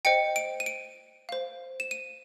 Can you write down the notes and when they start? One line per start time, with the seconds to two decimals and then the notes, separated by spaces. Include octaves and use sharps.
0.05 C5 D#5 G5 C#7
0.36 D7
0.60 D#7
0.66 D7
1.29 C5 F5
1.80 E7
1.91 D#7